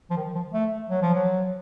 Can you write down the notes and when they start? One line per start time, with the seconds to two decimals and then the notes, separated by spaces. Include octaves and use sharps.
0.10 F3
0.17 D#3
0.35 F3
0.53 A3
0.90 F#3
1.02 F3
1.14 F#3